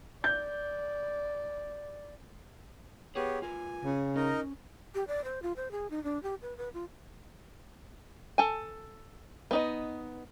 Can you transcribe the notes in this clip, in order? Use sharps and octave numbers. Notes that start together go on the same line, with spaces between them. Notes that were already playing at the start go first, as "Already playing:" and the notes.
D5 G6
B3 G4 G#4 B4 C#5
F4 A#4 B4 G#5
C#3
C#4 D#4 A#4 D#5
G4
D5
C5
F4
C5
G#4
D#4
D4
G4
B4
B4
F4
A4 G#5
B3 D#4 D#5